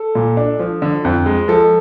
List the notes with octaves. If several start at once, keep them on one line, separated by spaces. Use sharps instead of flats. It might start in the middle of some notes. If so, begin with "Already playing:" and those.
Already playing: A4
A#2
D4
F3
D3
F2
G#3
F3 A4